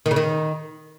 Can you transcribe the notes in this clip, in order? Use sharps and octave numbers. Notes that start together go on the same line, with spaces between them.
D#3
C#3
D#3